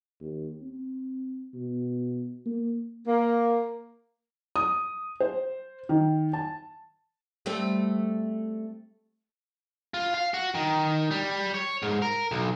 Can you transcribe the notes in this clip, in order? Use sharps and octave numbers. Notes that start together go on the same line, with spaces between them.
D#2
C4
B2
A#3
A#3
D#6
C5
D#3
A5
G3 A3 C4
F4
F5
F#4
D#3
G3
C#5
G#2
A#4
B1